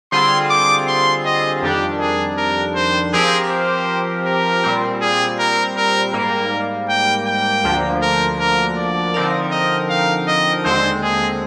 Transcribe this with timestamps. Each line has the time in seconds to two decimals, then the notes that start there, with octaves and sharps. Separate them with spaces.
0.12 D3 G3 C4 F4 G#4 C6
0.50 D6
0.88 C6
1.25 D#5
1.62 F2 D#3 G3 D4 G4
2.00 G#4
2.38 A#4
2.76 C5
3.13 F3 C4 G4 G#4 A#4
3.50 C5
4.26 A#4
4.64 A#2 G3 C4
5.01 G#4
5.39 A#4
5.77 A#4
6.13 G#2 G3 A#3 A#4
6.89 G5
7.26 G5
7.64 D2 D3 F3 A#3 D4
8.02 A#4
8.40 A#4
8.77 D5
9.14 D3 F3 C4 D#4 A#4
9.52 D#5
9.90 F5
10.28 D#5
10.64 D#2 D3 G#3 C4 C5
11.03 G#4